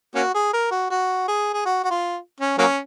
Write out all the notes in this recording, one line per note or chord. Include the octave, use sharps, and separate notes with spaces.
A#3 C#4 F#4
G#4
A#4
F#4
F#4
G#4
G#4
F#4
F#4
F4
C#4
F#3 A#3 C#4